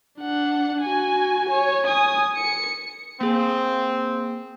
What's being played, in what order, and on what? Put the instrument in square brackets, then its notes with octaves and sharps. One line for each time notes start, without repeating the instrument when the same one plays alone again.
[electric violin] D4 F#5
F#4 G#5
C#5 G#5
G#5 D#6
C#7
[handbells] A#3 G#4 [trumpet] C4